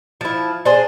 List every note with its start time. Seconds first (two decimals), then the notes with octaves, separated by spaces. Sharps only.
0.21 F3 E4
0.65 D4 G#4 C5